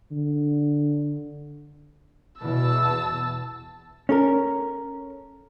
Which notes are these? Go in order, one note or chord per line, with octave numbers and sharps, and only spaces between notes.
D3
E2 B2 E3 A5 E6
C#4 A4 A#4